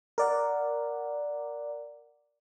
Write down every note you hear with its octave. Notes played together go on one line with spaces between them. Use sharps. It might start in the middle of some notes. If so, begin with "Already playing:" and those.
A#4 D5 F#5